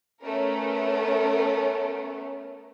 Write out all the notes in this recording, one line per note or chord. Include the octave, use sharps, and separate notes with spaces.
A3 B3 C#4 A#4